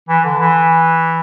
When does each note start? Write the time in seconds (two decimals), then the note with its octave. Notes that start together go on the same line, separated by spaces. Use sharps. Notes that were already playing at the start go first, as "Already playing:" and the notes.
0.09 E3
0.25 D3
0.39 E3